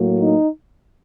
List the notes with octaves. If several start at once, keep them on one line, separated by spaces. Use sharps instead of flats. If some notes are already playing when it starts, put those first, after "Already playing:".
Already playing: A2 F#3 A#3
D#4